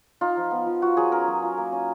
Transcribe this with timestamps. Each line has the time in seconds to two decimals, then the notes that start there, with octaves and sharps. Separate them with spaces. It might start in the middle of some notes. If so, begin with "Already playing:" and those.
0.21 D#4 F4
0.37 F3
0.51 B3
0.66 F3
0.82 F4 F#4
0.97 F#3 G#4
1.12 C#4 A#4
1.28 F#3
1.42 F4
1.57 A#3
1.72 C#4